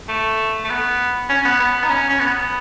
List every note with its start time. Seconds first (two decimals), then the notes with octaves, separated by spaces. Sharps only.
0.08 A3
0.64 A3
0.69 B3
1.29 C#4
1.45 B3
1.60 B3
1.83 D#4
1.90 C#4
2.10 C#4
2.20 B3